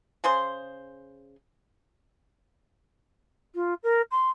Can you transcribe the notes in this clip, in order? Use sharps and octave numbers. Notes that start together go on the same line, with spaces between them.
C#3 G#4 C5 C6
F4
A#4
C6